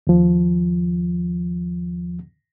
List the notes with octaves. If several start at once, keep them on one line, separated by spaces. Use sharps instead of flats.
D#2 F3